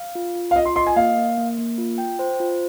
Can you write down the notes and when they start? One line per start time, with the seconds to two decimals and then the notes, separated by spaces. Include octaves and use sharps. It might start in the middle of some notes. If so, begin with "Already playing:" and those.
Already playing: F5
0.15 F4
0.35 F4
0.51 F5
0.56 F4 D#5
0.65 C6
0.76 D#5 C6
0.87 G#5
0.96 A#3 F5
1.16 A#3
1.38 A#3
1.58 A#3
1.78 F4
1.98 G5
2.19 C5
2.40 F4